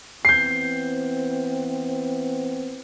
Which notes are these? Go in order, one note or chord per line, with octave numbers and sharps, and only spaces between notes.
E3 B3 C4 G6 C7